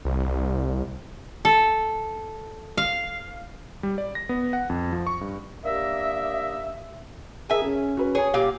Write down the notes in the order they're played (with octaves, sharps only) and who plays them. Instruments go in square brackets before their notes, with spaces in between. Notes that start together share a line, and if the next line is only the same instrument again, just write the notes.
[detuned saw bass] C2
[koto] A4
F5
[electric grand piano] G3
D5
A#6
B3
F#5
F2
F3
C#6
G2
[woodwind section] A#3 D4 G4 A#4 D#5 E5
[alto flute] G#4 [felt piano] A#4 [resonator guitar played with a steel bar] E5 G#5
[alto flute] C#4 [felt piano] G#4
[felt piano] F#4 B4
[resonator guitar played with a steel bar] G#4 [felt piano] C#5 G#5
[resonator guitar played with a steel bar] A#2 F5 [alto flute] G4